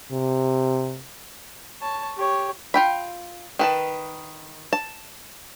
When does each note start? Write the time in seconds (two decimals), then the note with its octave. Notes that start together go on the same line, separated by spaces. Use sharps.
0.12 C3
1.80 C#5 A5
2.17 G4 C#5
2.74 F4 G5 B5
3.59 D#3 B4 A5
4.73 A5